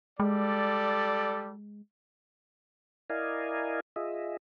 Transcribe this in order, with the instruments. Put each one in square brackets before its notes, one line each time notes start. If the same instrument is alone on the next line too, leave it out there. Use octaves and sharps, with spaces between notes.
[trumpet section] G3 A4 D5 [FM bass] G#3
[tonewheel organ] E4 A#4 D5 D#5 F5 G#5
F4 G#4 D#5 E5